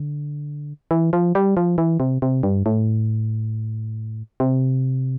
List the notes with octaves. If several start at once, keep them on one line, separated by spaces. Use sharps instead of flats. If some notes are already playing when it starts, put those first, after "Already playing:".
Already playing: D3
E3
F3
G3
F3
E3
C3
C3
G2
A2
C3